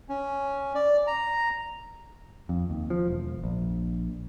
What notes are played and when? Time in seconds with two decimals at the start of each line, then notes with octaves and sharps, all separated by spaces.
0.09 C#4
0.75 D5
1.07 A#5
2.49 F2
2.70 D#2
2.90 F3
3.08 E1
3.44 A#1